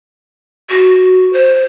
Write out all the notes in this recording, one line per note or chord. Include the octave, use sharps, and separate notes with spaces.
F#4
C5